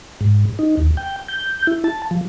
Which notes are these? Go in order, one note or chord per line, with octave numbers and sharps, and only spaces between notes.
G#2
D#4
D#2
G5
G6
E4
A5
F3